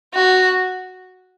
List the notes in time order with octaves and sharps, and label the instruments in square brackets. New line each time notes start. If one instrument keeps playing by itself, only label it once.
[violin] F#4